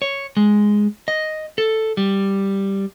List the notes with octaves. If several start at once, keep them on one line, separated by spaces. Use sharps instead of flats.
C#5
G#3
D#5
A4
G3